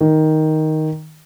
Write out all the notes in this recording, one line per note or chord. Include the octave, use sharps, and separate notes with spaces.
D#3